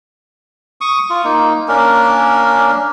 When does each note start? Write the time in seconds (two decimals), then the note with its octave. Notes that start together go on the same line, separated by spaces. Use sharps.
0.81 C#6 D#6
1.10 F4
1.24 A#3 D#4
1.68 A#3 C#4 D4 A#4